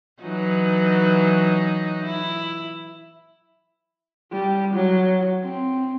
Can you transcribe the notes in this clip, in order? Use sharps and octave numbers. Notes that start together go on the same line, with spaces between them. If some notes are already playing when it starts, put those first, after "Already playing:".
E3 F#3 D#4
E4
G3
F#3
C4